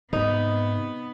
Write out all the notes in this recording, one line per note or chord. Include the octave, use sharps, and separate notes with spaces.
G#2 C3 B3 D#4